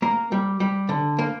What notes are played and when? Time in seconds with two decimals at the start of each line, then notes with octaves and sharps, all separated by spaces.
0.02 A#3 A#4
0.32 G3
0.60 G3
0.89 D3
1.19 A#3